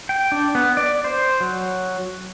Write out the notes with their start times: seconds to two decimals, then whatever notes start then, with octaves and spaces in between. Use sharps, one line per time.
0.09 G5
0.32 D4
0.55 B3
0.77 D5
1.04 C5
1.40 F#3